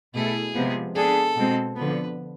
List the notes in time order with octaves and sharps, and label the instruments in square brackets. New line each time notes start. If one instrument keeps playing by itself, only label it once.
[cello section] B2 A3 E4 A4 [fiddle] G#4
[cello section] C3 F3 G#3 B3
[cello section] B3 D4 G#4 [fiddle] A4
[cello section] B2 G#3 C4
[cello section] D3 F3 B3 [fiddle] B4